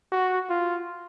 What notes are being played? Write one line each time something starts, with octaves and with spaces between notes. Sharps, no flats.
F#4
F4